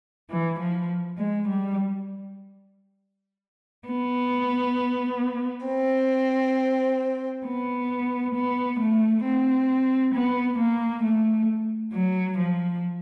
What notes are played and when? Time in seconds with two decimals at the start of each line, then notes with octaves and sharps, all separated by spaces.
0.30 E3
0.59 F3
1.18 G#3
1.48 G3
3.88 B3
5.67 C4
7.46 B3
8.35 B3
8.80 A3
9.24 C4
10.14 B3
10.59 A#3
11.03 A3
11.92 F#3
12.37 F3